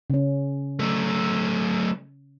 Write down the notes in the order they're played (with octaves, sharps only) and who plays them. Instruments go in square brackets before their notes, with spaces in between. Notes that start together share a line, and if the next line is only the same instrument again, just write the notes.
[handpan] C#3 C#4
[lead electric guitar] F#3 A3